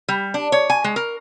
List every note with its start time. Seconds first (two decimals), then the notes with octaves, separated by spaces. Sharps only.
0.09 G3
0.34 D4
0.52 C#5
0.70 G#5
0.84 G#3
0.96 A#4